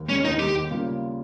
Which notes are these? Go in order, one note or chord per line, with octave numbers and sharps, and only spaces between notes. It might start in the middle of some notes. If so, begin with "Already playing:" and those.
Already playing: D#2
D#3 G#3 C#4 D#4
D#2 D#4
D#3 G#3 D#4 G4
D#2
C#3 G3 A#3 F4